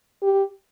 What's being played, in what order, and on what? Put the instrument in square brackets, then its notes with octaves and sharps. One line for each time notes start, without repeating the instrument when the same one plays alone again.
[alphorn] G4